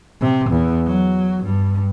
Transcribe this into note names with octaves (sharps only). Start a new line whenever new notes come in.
C3
E2
F#3
G2